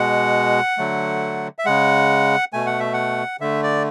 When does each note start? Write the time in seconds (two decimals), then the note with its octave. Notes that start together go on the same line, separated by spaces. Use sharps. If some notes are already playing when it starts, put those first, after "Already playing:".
Already playing: B2 G#3 F#5
0.78 D3 F#3 A3
1.59 E5
1.66 C#3 G#3 F#5
2.53 B2 A3 G#5
2.67 F#5
2.80 E5
2.93 F#5
3.40 D3 A3 E5
3.63 D5